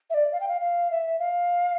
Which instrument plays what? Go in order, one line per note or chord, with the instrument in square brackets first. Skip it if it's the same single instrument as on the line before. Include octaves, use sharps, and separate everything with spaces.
[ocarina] E5
D5
F5
G5
F5
F5
E5
F5